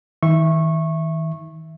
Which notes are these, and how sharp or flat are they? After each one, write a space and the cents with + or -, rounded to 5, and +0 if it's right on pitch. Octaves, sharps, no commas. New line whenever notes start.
D#3 +40 E5 +5 C#6 -20